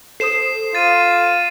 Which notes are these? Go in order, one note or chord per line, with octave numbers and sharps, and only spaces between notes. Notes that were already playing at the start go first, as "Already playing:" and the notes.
A4 C5 D#6 C7 E7
F4 A6 D#7